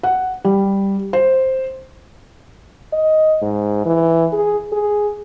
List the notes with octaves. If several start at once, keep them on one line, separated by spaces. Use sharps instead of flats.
F#5
G3
C5
D#5
G#2
E3
G#4
G#4